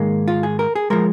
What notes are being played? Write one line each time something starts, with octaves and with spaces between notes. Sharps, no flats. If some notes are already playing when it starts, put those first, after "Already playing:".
Already playing: G#2 D#3 G#3 A#3
F4
G#4
A#4
G#4
F3 G#3 A#4